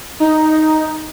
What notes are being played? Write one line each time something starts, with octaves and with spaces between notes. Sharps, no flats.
D#4